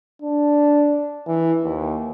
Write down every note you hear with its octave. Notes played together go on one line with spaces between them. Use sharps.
D4
E3
D#2